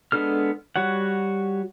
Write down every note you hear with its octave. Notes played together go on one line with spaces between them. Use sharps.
G#3 B3 D4 A4 F6
G3 F#4 C#5 F#5